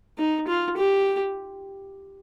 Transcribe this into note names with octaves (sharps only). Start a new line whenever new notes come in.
D#4
F4
G4